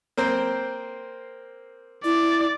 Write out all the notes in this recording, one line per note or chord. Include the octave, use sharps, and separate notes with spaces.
A#3 C4 C5
E4 D5